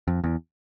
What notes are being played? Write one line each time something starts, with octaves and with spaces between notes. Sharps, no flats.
F2
E2